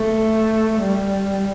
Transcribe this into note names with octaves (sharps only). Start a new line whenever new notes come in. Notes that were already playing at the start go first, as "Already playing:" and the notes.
Already playing: A3
G3